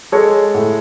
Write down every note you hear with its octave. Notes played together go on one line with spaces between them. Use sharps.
G#3 A4 C#5
A2